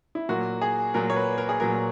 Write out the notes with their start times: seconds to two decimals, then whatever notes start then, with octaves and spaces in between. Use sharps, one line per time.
0.15 E4
0.29 A#2 F#3 A#3 F#4
0.62 G#4
0.94 A#2 F#3 A#3 A#4
1.10 C#5
1.16 B4
1.38 A#4
1.49 G#4
1.60 A#2 F#3 A#3 A#4